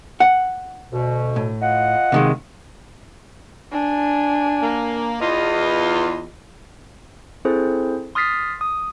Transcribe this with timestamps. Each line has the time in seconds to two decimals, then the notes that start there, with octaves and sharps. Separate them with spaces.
0.20 F#5
0.92 D2 B2
1.36 A2
1.62 F4 D#5 F#5
2.12 C3 D#3 G#3
3.72 D4 G#5
4.62 A#3
5.21 E2 F4 D#5
7.45 C4 E4 G#4 A4 C5
8.15 C6 D#6 F6 A6 B6 C7
8.61 D#6